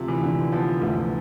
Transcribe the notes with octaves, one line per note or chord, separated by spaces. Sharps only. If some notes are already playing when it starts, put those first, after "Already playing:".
Already playing: D2 C3 F3
E3
D3
F3 B3
D2